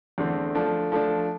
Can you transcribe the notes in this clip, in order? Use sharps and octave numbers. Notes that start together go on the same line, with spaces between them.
E2 D3 A3 C4
F3 A3 D4
F3 A3 D4